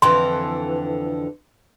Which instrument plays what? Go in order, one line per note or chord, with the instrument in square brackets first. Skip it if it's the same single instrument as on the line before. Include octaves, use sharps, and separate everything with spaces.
[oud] F2 D3 E3 [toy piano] C6